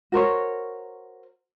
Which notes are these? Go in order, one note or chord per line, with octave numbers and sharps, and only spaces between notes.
F#4 A#4 C5 C#5